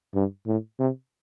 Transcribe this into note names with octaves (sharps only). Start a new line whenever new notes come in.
G2
A2
C3